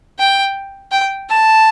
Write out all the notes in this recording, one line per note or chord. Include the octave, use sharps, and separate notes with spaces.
G5
G5
A5